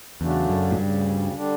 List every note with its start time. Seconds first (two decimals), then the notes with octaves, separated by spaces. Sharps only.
0.20 E2 C#3 F#3 A3 D4
0.49 F#2
0.71 A2
0.76 D2 G2 C#3 G3
1.34 D3 G3 D4